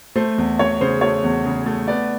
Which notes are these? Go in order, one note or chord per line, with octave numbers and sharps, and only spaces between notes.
A3 C5
E2
E2 C#5
C#3 C5
A3 C#5
E2
C#3
A3
B3 D5